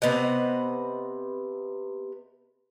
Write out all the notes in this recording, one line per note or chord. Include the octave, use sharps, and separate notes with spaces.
C3 B3 D#5 F#5